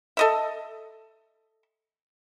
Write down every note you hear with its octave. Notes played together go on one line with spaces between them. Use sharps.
A4 D#5 E5